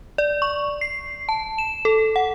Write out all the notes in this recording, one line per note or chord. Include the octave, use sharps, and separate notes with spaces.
D5
C#6
C7
A5
E7
A4
F#5